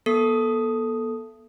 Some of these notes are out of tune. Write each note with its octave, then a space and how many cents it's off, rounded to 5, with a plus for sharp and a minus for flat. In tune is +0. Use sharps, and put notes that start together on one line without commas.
B3 -45 A4 +0 D#6 +0